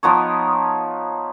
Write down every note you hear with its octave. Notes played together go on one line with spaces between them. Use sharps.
F3 B3 D#4 C#5